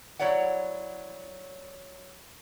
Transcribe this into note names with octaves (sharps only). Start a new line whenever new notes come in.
F#3 E4 C#5 D5 F#5